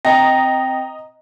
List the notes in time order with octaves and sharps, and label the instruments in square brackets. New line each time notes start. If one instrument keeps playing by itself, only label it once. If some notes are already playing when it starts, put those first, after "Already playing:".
[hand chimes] C4 G5 A#6 [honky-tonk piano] D#5 A#5